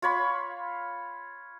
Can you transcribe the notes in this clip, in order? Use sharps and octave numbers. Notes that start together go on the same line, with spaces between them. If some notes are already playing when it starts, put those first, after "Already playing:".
F4 C#5 B5